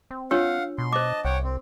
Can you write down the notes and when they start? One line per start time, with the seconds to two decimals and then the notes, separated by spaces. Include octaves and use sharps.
0.11 C4
0.31 D4 F4 C#5 F5 F#5 E6
0.78 B2 C6
0.93 C5 D#5 A5 D6
1.25 C2 C#5 F#5 G5
1.43 C4